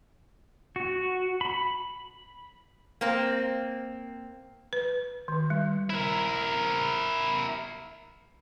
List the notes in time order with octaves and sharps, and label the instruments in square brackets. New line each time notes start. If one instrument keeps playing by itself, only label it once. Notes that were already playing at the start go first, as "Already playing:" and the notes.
[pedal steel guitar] F#4
B5
[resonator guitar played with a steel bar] A#3 C4
[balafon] B4
D#3
G3
[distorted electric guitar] E4 A#4